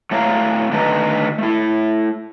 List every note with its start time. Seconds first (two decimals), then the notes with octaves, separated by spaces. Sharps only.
0.11 A2 A3 C#5 F5 A#5
0.72 D3 D#3 A3 B4 D#5 A#5
1.38 A3 E4